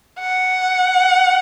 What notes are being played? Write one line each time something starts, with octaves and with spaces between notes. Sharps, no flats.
F#5